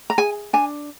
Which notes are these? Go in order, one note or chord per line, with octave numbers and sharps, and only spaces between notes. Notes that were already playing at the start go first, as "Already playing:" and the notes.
A#5
G#4 G#5
D4 G#5